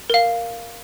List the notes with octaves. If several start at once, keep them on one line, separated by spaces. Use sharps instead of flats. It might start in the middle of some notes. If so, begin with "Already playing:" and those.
A#4 F5